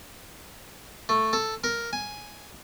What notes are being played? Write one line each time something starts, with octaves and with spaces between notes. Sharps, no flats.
A3
A4
A#4
G#5